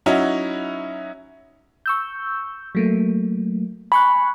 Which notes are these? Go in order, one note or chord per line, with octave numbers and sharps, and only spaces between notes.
F#3 C#4 D#4 E4 F#4
C#6 E6 G6
F#3 A3 A#3
G#5 B5 C#6 F#6